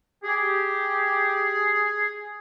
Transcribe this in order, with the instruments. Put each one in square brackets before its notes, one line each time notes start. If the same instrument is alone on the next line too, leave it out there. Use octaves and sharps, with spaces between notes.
[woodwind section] G4 [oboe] G#4